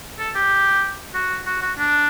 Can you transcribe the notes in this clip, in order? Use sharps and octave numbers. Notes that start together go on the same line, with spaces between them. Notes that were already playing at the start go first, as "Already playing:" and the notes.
A4
G4
F#4
F#4
F#4
D4